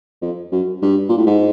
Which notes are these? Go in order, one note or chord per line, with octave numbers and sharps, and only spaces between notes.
F2
F#2
G2
A#2
A2
G#2